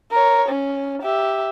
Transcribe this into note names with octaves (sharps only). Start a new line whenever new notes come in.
A#4 C#5
C#4
G4 E5